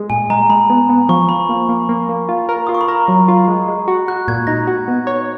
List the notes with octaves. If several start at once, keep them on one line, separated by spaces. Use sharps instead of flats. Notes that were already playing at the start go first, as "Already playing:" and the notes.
Already playing: G#3
A#2 G#5
G#3 A#5
G#3 B5
B3
B3
F3 C#6
F3 B5
A#3
A#3
A#3
A#3
F4
A#4
F4 D#6
C#6
B5
A#4 A#5
F#3
F4
G#3
G#3
F#4
F#4 F#6
A#2 G#6
D#4 A#6
F#4
B3
C#5